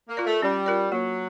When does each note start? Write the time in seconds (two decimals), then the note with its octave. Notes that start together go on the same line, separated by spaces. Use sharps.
0.09 A#3
0.17 F4 A#4 D5
0.25 A3
0.42 G3 C#4
0.66 F4 A#4 D5
0.91 F#3 A#3